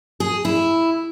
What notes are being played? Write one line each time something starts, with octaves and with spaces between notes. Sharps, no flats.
G#4
E4